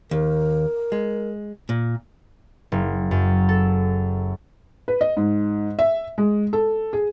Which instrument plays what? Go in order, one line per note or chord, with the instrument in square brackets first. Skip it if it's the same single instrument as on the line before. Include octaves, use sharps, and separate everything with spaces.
[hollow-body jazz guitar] D#2 [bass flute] A#4
[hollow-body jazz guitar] G#3
A#2
[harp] F#1
F#2
A4
[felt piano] B4
D#5
G#2
E5
G#3
A4
G#4